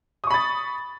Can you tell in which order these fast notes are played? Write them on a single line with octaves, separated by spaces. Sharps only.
D#6 C#6 B5 A6